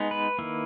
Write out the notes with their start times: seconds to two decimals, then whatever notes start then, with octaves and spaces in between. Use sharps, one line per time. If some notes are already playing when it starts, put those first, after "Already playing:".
Already playing: G#3 B3 D#4
0.11 B4
0.38 D#3 A#3 E4